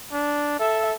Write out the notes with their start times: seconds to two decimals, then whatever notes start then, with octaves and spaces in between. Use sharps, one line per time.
0.13 D4
0.60 A4 E5